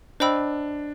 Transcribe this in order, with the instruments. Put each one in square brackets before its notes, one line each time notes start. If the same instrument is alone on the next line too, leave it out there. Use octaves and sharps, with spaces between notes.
[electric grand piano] D4 [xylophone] C5 D#5 G5 B5 E6